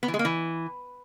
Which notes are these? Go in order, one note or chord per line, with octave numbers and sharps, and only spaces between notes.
B3
E3
G#3
A#3
E3